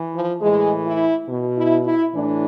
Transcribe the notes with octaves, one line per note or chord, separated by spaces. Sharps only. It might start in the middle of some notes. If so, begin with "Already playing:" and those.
Already playing: E3
F3
A2 E3 G#3
E4
B2
E4
E4
A2 E3 D4